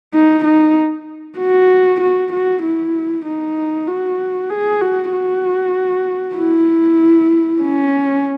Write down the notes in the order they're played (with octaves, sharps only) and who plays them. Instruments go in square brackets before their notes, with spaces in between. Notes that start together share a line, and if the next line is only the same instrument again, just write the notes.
[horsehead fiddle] D#4
D#4
F#4
F#4
F#4
E4
D#4
F#4
G#4
F#4
F#4
E4
C#4